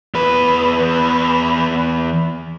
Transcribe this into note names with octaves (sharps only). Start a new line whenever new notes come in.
E2 B4